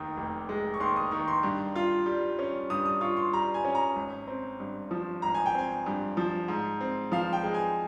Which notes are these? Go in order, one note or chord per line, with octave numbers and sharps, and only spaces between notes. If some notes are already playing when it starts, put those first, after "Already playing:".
Already playing: F1 D#2 D#3
F1
G#3
C#6
D#2 C6
D#6
D#3 C#6
C6
G2
F4
G3
C#4
G2 D#6
D#6
F4 C#6
C6
G3 A#5
G#5
C#4
A#5
G#1
C4
G2
F3
G#1 A#5
G#5
G5
C4 G#5
G2
F3
G#2
C4
F3 F5
G5
G#3
G#5